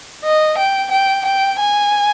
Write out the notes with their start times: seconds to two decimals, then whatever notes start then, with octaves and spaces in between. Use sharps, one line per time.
0.24 D#5
0.57 G5
0.91 G5
1.25 G5
1.59 G#5